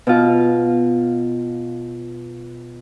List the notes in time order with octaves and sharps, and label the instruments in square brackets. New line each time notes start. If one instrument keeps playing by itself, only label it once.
[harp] B2 F4